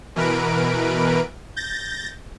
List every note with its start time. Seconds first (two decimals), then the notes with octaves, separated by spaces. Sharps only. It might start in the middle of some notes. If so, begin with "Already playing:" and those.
0.16 B2 E3 A#4 B4 D7
1.56 G6 A6 A#6